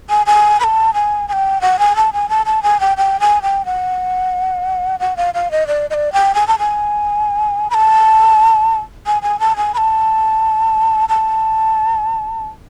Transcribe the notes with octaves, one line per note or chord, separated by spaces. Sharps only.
G#5
G#5
B5
A5
G#5
G#5
G5
F#5
G#5
A5
G#5
A5
A5
G#5
G5
G5
G#5
G5
F#5
F#5
F5
F5
D#5
D5
D#5
D5
G5
G#5
A5
G#5
B5
A5
G#5
G#5
A5
G#5
B5
A5
A5